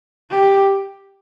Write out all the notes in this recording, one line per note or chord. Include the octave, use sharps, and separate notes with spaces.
G4